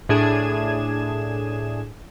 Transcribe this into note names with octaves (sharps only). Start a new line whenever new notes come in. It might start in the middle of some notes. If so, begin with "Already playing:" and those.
A2 D4 G#4 G#6 E7